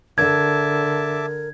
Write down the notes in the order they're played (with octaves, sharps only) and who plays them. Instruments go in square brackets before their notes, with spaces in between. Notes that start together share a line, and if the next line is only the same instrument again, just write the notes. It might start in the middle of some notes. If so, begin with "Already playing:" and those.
[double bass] D3 [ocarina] A#4 [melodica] E5 A5 D6 [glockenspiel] G#6